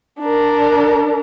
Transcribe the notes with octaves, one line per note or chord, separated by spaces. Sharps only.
D4 A#4